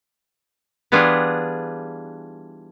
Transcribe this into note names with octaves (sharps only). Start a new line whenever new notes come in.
E3 G3 B3 D4 F4 G#4